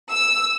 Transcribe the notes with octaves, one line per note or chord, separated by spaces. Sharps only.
E6